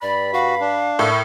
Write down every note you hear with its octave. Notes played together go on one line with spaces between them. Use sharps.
G2 D5 B5
F#4 F5
D4
A2 E4 A#4 E5